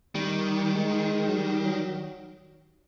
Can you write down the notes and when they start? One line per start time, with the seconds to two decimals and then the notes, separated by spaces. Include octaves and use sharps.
0.15 D#3 G3
0.75 G#3
1.28 F#3
1.36 G3
1.65 F#3